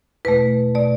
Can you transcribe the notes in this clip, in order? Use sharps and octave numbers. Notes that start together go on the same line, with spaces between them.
E2 B2 A3 B4
B2 A3 D5